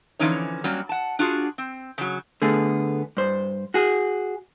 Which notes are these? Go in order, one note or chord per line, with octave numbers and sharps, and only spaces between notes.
D3 E3 F3 C#4 D#4 C#5
F#3 G3 A#3 C#4
F#5 A5
D4 F4 F#4 G#4
C4
C#3 F#3
D3 A3 B3 G#4
G2 C5
F#4 G#4